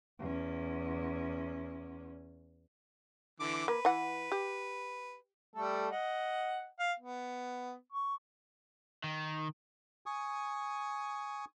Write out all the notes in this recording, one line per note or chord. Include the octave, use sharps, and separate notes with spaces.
E2 C#4
D3 E3 D6
A#3 B4
E3 F#5
G4
G3 A3 A4
D#5 F#5
F5
B3
C#6
D#3
G#5 C#6 D#6